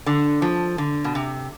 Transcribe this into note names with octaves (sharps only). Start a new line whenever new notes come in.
D3
F3
D3
B2
C3